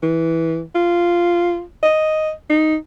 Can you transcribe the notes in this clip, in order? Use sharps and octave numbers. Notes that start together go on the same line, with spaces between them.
E3
F4
D#5
D#4